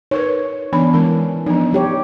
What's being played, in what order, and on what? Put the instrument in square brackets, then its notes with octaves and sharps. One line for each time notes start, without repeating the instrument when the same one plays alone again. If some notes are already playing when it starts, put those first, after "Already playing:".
[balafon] D#4 A#4 B4 [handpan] C#5
[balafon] E3 B3 B5 [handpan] D4
[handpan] E3 C#4 [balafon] G#3 A#4
[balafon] F3 B3 D4 [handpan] D#4
[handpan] G3 G4 C#5